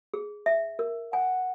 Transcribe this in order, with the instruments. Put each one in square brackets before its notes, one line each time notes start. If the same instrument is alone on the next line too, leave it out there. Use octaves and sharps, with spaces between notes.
[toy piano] G#4
E5
A#4
[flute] F#5 [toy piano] G#5